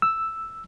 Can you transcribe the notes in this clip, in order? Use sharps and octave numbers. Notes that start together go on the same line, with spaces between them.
E6